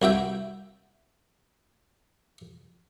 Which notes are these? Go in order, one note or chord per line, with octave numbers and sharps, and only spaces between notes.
C2 F#4 E5 G5